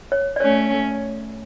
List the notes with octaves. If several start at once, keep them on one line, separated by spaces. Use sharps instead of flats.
C#5
D5
A3 C#4 C#5